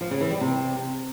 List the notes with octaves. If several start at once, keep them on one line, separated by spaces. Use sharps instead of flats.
F3
C#3
E3
G3
C3